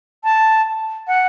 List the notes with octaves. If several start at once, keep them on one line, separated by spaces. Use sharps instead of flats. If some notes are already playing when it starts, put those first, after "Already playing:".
A5
F#5